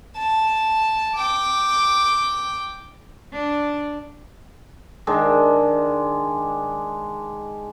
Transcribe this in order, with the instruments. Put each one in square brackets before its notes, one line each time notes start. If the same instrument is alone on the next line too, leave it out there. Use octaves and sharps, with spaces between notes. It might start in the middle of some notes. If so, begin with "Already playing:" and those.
[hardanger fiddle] A5
G5 D6
[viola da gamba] D4
[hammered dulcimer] D#3 G#3 D4